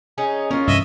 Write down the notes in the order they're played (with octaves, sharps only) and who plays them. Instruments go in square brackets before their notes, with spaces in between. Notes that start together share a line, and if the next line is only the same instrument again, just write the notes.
[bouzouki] C#4 D#4 G#4
[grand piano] C#4 [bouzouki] F4 A#4
[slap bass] G2 C3 E3 [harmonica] D#5 E5